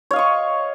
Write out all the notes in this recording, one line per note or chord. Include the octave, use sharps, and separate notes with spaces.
C#5 D#5 F5 C#6